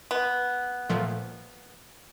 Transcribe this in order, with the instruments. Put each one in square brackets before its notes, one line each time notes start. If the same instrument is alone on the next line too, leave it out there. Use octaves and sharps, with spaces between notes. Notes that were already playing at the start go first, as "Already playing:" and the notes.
[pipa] B3
[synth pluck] A#2 F3 A3